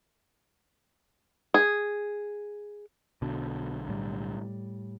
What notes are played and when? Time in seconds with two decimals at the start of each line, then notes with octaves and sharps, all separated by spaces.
1.54 G#4
3.22 B1 B2 D3
3.89 A2 G3